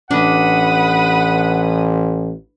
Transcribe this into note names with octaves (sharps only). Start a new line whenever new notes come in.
A1 D4 B4 F#5 D#6